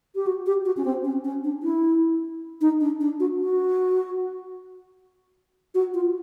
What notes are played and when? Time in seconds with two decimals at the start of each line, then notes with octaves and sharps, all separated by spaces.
0.15 G4
0.27 F#4
0.46 G4
0.65 F#4
0.77 C#4
0.85 C4
1.04 C#4
1.24 C#4
1.44 D4
1.63 E4
2.61 D#4
2.81 D4
3.01 D4
3.20 F#4
3.40 F#4
5.75 F#4
5.94 F4